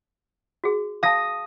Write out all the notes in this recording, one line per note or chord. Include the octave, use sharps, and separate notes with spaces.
F#4 G#4
F5 A5 D#6 A#6